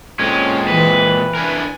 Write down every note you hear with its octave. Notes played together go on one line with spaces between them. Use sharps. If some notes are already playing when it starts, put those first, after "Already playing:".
A#2 G#3 C4 C#4 A4
E3 B4
D4 E4 A#4 G#5